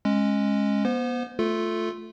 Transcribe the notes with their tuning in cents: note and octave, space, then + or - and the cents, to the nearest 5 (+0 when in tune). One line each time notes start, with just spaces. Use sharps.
G#3 +0 C#4 -20
B3 -35 C5 -25
A3 +0 F4 +0 A4 +0